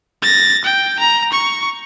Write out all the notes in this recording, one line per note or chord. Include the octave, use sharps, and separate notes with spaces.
A6 A#6
G5
A#5
C#6